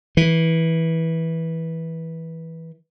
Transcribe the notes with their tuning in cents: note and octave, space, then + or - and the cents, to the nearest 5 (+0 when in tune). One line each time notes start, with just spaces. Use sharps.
E3 -15